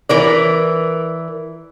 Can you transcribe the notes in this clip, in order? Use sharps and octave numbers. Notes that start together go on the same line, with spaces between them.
E3 A#4 D5